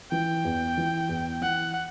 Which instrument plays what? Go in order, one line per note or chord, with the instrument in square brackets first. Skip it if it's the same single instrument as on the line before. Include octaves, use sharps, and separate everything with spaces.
[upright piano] E3 [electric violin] G5
[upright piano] E2
E3
E2
[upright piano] E3 [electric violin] F#5